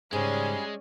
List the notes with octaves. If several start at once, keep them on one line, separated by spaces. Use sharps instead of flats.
G#2 C#3 G3 G#3 C#4 G#4 D5